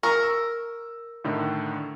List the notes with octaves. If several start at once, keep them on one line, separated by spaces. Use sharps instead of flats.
A#4 C#6
E6
A2 D3 D#3